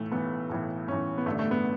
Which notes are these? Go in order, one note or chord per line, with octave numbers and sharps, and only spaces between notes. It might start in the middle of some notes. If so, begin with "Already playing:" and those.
Already playing: B1 A2 E3 A3
B1 A2 E3 B3
B1 A2 E3
B1 A2 E3 C#4
B3
A1 G2 D3 A3
A3
B3